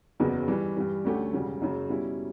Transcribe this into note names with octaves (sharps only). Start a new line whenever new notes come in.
F#1 E2 C#3 F#3 B3
G2 E3 G3
G2 E3 G3
D2 D3 A3 C#4 G4
E1 D2 C#3 G3
F#1 F#2 C#3
B2 G3 C#4 E4